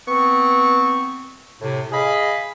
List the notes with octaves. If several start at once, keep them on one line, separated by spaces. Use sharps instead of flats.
B3 C4 C#6
A2 C3
G#4 D#5 F5 B5